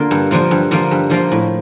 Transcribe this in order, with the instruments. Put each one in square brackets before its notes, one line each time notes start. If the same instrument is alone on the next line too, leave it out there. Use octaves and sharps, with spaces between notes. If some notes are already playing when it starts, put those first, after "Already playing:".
Already playing: [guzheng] D3 A#3 F4
G2
D3 F3 A#3 F4
G2
D3 F3 A#3 F4
G2
D3 F3 A#3 F4
A2